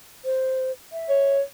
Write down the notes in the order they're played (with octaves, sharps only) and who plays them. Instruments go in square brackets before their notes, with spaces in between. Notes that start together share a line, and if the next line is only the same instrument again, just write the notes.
[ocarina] C5
E5
[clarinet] C#5